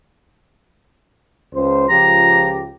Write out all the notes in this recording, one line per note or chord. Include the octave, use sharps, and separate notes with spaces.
C#2 C5
C#2 F3 G4 A#5